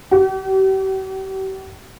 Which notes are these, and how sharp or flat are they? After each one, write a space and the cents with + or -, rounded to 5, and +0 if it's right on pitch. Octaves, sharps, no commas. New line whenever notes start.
G4 -40